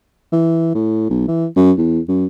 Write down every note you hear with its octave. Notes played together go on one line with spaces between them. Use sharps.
E3
A2
B1
E3
F#2
E2
F#2